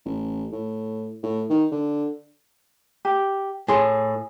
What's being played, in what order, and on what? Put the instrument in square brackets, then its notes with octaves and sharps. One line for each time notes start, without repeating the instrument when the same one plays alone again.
[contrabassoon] A1
A2
A2
D#3
D3
[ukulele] G4
[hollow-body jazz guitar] A2 C6 [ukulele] G#4